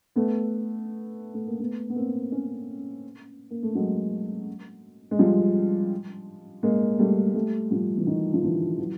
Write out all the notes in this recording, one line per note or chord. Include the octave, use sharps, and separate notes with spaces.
A3 B3
A3
A#3
A3 B3
B3
A#3 C4
B3 C#4
A#3
A3
F#3 G#3
G#3
F3 G3
G#3 A#3
G3 A3
G3 A3
F3 G3
E3
D#3
F3
D3 E3
E3 F#3